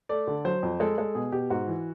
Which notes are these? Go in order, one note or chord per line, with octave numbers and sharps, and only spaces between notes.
A3 D5
D3
F#3 C5
F2
G#3 A4
G#3 A4
B2 G#4
B2 G4
G#2 F#4
E3